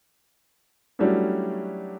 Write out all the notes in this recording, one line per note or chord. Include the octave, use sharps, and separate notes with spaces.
F#3 G3 A3 C#4 D4 E4